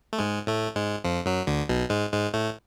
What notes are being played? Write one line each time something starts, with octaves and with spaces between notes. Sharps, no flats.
A3
G#2 G#3
A2 A3
G#2 G#3
F2 F3
F#2 F#3
D2 D3
B1 B2
G#2 G#3
G#2 G#3
A2 A3